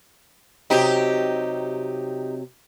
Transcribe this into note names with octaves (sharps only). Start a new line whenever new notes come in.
C3 F#3 C4 D#4 G4